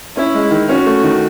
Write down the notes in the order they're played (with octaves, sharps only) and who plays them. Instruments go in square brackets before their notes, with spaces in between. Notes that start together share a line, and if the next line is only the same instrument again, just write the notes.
[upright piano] C#4 [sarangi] E4
[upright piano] G#3
D#3
[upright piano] C#4 [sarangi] F#4
[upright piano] A3
D#3